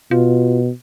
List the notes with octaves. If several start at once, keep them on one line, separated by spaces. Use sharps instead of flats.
B2 F4